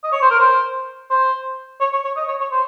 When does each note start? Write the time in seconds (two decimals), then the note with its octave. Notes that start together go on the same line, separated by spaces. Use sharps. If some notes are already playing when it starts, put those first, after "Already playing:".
0.04 D#5
0.12 C#5
0.22 C5
0.31 A#4
0.39 C5
1.11 C5
1.80 C#5
1.92 C#5
2.04 C#5
2.16 D#5
2.28 C#5
2.40 C#5
2.51 C5